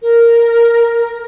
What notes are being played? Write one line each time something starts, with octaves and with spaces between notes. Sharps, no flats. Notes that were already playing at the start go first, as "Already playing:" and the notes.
A#4